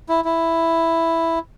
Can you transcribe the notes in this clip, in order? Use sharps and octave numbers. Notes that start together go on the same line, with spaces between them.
E4
E4